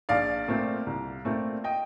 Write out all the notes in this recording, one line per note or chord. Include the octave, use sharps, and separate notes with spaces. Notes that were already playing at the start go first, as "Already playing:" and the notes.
A#1 D5 F5
A#2 A3 C4
C2
A#2 A3 C4
D#5 G5